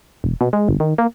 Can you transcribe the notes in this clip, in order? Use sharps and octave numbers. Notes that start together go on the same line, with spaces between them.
E1
B2
G#3
G1
D#3
A#3